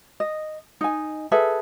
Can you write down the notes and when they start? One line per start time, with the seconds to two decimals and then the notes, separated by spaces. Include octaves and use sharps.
0.20 D#5
0.81 D#4 G#5
1.32 G#4 A4 B4 E5